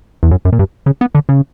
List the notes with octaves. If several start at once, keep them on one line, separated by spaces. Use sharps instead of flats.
E2
F#2
F#2
A#2
G2
C#3
B3
D3
C#3